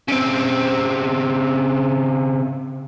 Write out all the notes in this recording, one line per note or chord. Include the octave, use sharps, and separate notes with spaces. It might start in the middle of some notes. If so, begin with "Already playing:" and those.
C#3 C4